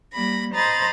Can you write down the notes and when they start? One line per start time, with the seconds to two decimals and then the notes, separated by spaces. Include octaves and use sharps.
0.13 G3 A#3 B5 A#6
0.53 C5 D#5 A#5 B5 A6